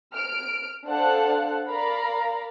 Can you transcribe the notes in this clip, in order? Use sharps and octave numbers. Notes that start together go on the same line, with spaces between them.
F6 D7
D4 A4 C5 F5 F#5 F#6
A#4 D5 F5 A#5 B5